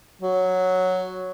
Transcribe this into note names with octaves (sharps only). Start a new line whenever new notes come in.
F#3